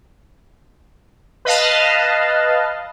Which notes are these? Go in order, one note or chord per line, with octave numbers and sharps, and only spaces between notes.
B4 D#5 F5 A5